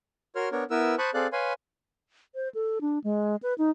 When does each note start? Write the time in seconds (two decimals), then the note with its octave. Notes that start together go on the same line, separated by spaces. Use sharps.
0.36 F#4 A#4 C#5 C6 F6
0.52 B3 D4 A#4 C#5
0.71 B3 E4 A#4 B4 E6
0.98 C5 A5 B5 C#6 D#6 F#6
1.14 C4 G#4 A4 D5 F5 F#6
1.33 B4 C#5 F5 G#5 B5 C6
2.35 C5
2.55 A4
2.81 D4
3.04 G#3
3.43 B4
3.58 D#4